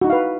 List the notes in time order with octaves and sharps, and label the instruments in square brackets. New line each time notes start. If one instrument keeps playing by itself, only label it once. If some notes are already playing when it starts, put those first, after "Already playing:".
[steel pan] F#4
D#4
E4
F5
B4